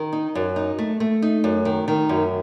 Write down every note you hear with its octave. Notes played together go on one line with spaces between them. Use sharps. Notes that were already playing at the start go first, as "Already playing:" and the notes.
Already playing: D#3
D#4
F#2
D#4
A3
A3
D#4
F#2
D#3
D#3
F#2